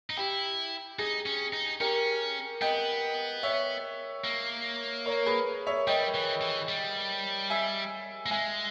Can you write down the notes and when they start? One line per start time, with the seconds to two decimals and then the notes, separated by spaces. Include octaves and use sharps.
0.10 D#4
0.17 E4 G4
0.99 D#4 G#4
1.26 C#4
1.53 D#4
1.80 C#4 G4 A#4
2.62 B3 D#5 G5
3.43 C#5 E5
4.24 A#3
5.06 A#4 C#5
5.26 G#4 B4
5.67 C#5 E5
5.87 G3 D#5 G5
6.14 E3
6.41 E3
6.69 G3
7.50 E5 G#5
8.26 A#3
8.31 G#3 E5 G#5